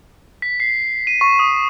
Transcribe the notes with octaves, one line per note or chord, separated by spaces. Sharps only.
B6
C7
D#7
C#6
D#6